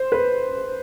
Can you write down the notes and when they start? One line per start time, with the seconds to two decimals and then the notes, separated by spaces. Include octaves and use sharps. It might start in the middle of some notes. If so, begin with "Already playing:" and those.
Already playing: C5
0.12 B4